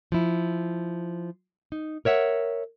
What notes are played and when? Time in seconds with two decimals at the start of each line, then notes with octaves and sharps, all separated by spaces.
0.12 F3 E4
1.72 D#4
2.05 A#4 C#5 E5 F#5